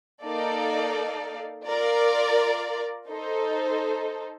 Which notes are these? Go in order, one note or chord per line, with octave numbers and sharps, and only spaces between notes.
A#3 D#4 A4 D5 F5
F4 A#4 D5
D#4 A4 C5